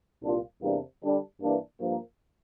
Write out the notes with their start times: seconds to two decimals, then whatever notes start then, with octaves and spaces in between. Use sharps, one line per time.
0.23 C2 A#2 G3 D4 F4
0.62 E2 C3 G3 A#3 D4
1.03 D3 G3 D4
1.41 G2 E3 A#3 D4
1.81 G2 F3 A#3